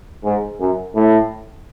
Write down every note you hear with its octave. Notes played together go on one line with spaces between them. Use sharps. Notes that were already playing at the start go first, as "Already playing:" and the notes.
G#2
F#2
A2